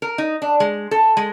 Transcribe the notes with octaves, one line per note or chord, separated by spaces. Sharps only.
A#4
D#4
D4
G#3
A4
G#3